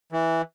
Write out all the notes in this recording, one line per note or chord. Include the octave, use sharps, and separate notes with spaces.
E3